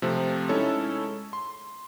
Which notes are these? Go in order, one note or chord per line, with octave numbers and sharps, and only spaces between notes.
C3 F3 A3 C4
G#3 C#4 D#4 E4 A4 C#5
C6